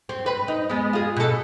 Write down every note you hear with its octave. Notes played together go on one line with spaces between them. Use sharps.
C4
B4
D#4
G#3 B3
F4 G#4
B2 A4